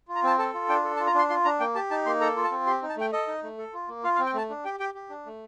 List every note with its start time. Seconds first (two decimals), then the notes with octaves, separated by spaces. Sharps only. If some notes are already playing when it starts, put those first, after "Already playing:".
0.08 F4
0.15 A#5
0.23 C4 A5
0.38 A4 A5
0.54 F4
0.69 D4 G5
0.84 A4
0.96 A5
1.00 F4
1.06 A#5
1.15 D4 C6
1.29 F4 C6
1.45 D4 A#5
1.60 A#3 G5
1.75 G4 A5
1.91 D#4 A5
2.06 A#3 C6
2.21 A4 A#5
2.36 F4
2.44 A5
2.51 C4
2.67 G4 C6
2.82 D#4
2.89 A5
2.97 A3 G5
3.13 A4 D#5
3.27 D#4
3.43 A3
3.58 A4
3.73 F4
3.88 A#3
4.04 F4 F5
4.15 F5
4.19 C4
4.26 G5
4.34 A3 A5
4.50 D4
4.65 G4 G5
4.80 G4 G5
4.94 G4
5.10 D4
5.26 A3